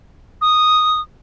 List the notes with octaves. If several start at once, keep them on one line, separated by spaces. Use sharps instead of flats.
D#6